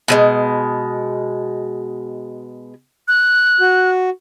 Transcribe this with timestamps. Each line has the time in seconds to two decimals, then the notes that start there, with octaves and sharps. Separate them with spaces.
0.08 B2 F#3 G#3
3.08 F#6
3.61 F#4